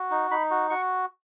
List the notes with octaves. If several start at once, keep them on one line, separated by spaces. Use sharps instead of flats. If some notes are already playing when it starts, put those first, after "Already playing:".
Already playing: F#4
D#4
D#4 B5
F#4
F#4 C#6